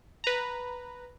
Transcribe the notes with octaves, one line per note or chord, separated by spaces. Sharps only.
B4 A#5